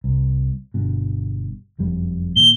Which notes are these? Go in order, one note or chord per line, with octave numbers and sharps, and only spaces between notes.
C2
G1 G2 B2
F#1 F2 G3
A#2 D#3 G7